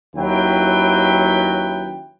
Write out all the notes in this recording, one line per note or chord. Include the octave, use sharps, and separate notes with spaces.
D#2 F#3 C#4 E4 B4 G5